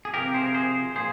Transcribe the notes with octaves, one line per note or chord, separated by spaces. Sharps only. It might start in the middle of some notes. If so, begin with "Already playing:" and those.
G#4
C3 F3 G4 A#4
G#4 C5
A#4
G#4 C5
A#2 F3 G#4 C5